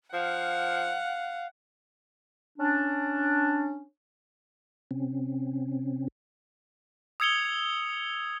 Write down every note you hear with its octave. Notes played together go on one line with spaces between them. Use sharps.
F3 F5 F#5
C#4 D4
C3 C4 C#4
D#6 E6 G#6 C#7 F7 G7